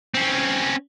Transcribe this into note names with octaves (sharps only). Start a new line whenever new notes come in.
C4 C#4